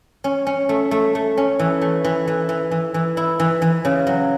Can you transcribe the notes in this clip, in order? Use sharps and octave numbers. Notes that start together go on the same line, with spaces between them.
C#4
C#4
A3
A3
A3
C#4
E3
A3
E3
E3
E3
E3
E3
E4
E3
E3
C#3
F#3